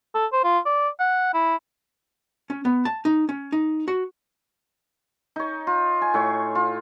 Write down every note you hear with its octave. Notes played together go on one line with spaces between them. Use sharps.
A4
C5
F4
D5
F#5
E4
C#4
B3
A5
D#4
C#4
D#4
F#4
D#4 C#5
F4
G#5
A2 C#5 C#6
F4